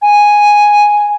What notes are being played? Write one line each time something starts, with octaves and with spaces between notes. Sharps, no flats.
G#5